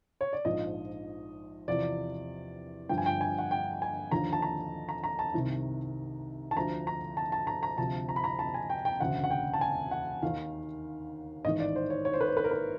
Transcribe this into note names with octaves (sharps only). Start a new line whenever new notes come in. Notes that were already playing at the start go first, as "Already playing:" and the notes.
C#5
D5
A#1 G#2 F3 D#5
E2 C3 F3 D5
G1 G2 D3 F3 G5
G#5
G5
G#5
F#5
G5
G#5
D#2 D3 F3 A#5
A5
A#5
A#5
A#5
A5
C2 C3 D#3
A5
D2 D3 F3 A#5
A#5
A5
A5
A#5
A#5
D2 C3 F3 A5
A#5
B5
A#5
A5
G#5
G5
G5
E1 D2 C#3 F#5
F#5
G5
A5
G#5
F#5
D#2 D#3 F5
A1 G#2 D#3 D#5
D5
C5
C#5
C#5
C5
B4
C5
B4
A#4
B4